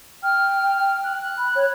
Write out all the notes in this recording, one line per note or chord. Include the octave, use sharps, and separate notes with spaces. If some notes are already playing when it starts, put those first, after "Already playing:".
G5 F6
F#6
F#6
B5
C#5